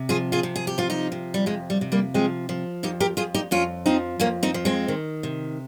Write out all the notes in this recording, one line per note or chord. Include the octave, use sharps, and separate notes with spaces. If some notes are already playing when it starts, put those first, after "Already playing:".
Already playing: C3
F3 F4 G#4
F4 G#4
C3
G#4
G4
F3 F4
D#4 G4
C3
G3
F2 G#3
G3
C3
G3 A#3
F3 G#3 C4
F3
F2 D#4 G4
G4 A#4
F2 F4 G#4
D#4 G4
F2 C#4 F4
F3 C4 D#4
F2 A#3 C#4
C4 D#4
F3
G#3 C4
D#3
C3